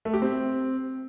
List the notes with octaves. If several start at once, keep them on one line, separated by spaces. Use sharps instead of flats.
A3
G4
C4